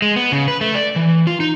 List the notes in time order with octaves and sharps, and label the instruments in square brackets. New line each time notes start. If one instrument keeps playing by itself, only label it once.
[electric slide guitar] G#3
B3
C#3
B4
A3
D5
E3
F4
D#4